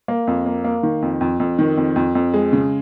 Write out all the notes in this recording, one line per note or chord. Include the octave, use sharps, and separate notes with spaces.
A#3
F2
A#3
A#3
D#3
F2
F2
F2
D#3
F2
F2
F2
G#3
C#3